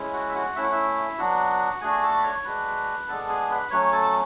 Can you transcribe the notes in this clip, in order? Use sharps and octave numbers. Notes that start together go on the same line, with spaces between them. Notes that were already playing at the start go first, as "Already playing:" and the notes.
Already playing: G#3 C#4 E4
F#4 F#5
E5
F#4 F#5
A3 C#4 E4 E5
F#5
E4 E5
F#3 B3 D4 F#4 F#5
A3 D4 F#4 G#4 G#5
A4 A5
B5
C#5 C#6
G#3 D4 F#4 B4 B5
G#3 B3 D4 A4 A5
G#4 G#5
B4 B5
F#3 A3 C#4 C#5 C#6
A4 A5